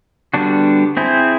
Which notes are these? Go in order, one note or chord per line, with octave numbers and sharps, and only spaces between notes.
D3 G3 B3 D4 F#4
C4 E4 G#4 C5